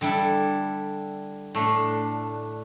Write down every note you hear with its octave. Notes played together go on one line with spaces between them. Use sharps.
D3 G3 E4 A4
A2 A3 D4